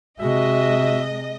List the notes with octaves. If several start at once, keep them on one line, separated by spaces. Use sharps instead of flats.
C3 G#3 F#4 D#5 E5